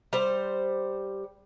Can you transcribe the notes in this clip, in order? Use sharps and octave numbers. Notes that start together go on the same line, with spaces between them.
G3 C5